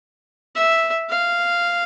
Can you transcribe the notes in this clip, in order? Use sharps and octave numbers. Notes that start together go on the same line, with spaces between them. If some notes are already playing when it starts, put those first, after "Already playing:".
E5
F5